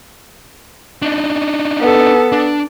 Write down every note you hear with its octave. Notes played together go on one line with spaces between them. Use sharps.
D4 D#4
B3 A4
D4